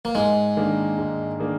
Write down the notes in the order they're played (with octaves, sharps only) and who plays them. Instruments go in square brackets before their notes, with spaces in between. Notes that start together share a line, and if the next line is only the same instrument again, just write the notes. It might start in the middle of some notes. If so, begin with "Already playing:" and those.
[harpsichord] A#3
[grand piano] G#2 [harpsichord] G#3
[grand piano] D#3 A#3 D4 G#4
G#2
D#3 A#3 D4 G#4